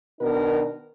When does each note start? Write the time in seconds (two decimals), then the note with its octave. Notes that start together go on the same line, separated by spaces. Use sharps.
0.21 B2 D#3 B3 D4 A#4